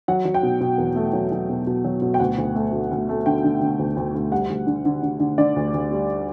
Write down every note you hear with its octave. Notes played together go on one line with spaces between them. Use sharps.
F#3 F#5
F#3
G5
B2
B2
E2
A3
F#3
F#3
B2
B2
F#3
B2
G5
D2 F#5
D2
A3
D2
D2
A3
D3 G5
D3
D3
D2
D2
D2
G3 F#5
D2
D3
D3
D3
D3
D3 D5
D2
D2
G3